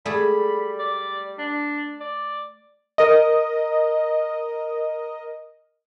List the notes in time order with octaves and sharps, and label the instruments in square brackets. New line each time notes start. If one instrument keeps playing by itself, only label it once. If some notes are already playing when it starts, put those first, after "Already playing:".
[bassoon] G3 [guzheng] A3 G#4 [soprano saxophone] B5
[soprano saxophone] D5
D4
D5
[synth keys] A#4 D#5